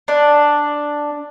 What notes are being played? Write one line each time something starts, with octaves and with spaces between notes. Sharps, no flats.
D4